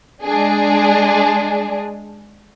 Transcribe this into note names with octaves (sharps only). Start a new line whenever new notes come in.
G#3 D4 G#4